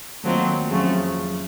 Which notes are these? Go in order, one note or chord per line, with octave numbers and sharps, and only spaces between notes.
D#2 D#3 F#3 A3 C4 F4
F2 C#3 F#3 A3